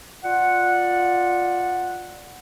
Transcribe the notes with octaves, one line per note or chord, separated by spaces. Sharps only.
F4 D5 F#5